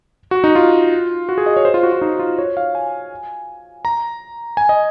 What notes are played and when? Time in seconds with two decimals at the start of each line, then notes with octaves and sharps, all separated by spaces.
0.31 F#4
0.44 D#4
0.55 F4
1.29 F#4
1.38 G#4
1.46 D#5
1.56 C#5
1.65 C5
1.74 F4
1.83 F#4
1.92 F4
2.02 D#4
2.19 F4
2.38 C#5
2.57 F5
2.75 G#5
3.85 A#5
4.57 G#5
4.69 D#5